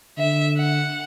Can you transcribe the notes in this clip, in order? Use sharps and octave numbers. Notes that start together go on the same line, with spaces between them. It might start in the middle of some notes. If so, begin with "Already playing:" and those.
D3 E5
F#5